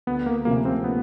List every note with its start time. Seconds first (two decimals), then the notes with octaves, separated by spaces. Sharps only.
0.07 D2 B3
0.26 A#3
0.45 C3 F3 A3 A#3 C#4
0.65 A#3 C4
0.84 B3